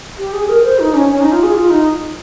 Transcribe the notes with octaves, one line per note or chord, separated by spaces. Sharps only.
G4
G#4
A#4
C5
D#4
C#4
C#4
D#4
F4
G#4
F4
D#4